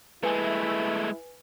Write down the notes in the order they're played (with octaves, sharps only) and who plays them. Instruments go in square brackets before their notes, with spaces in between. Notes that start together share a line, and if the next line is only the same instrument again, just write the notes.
[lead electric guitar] G#3 A3 [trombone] E4 [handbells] B4 G#5